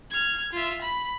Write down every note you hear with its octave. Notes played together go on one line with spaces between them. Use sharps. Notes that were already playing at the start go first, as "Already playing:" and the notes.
F6 G#6
F4 E5
B5